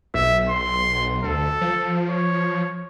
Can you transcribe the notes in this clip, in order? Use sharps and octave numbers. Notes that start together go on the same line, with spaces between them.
B1 E5
C6
D2 A4
F3
C#5